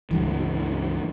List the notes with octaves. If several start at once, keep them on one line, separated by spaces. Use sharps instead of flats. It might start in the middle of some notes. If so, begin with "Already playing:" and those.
C#2 G2 E3